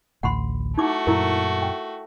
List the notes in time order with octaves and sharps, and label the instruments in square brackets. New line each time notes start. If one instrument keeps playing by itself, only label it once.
[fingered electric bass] A1 D2 A2 [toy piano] F#5 B5 C6
[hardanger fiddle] A3 F#4 [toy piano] D#4 E4 D6
[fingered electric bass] F#2 A#2 [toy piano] E4 A#4
[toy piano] G5